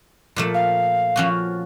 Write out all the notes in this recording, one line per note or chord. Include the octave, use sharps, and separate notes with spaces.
A#2 F3 A3
F5
F3 C#4 F#4